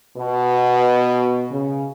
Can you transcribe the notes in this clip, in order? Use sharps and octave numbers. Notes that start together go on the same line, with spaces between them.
B2
C#3